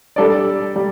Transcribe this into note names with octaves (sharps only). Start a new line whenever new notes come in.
G3 D4 A4 D5
G3